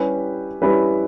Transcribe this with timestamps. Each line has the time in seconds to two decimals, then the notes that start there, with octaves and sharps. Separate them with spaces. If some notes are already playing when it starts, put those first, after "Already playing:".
Already playing: G3 C#4 E4 G4 B4
0.62 G3 C#4 E4 G4 B4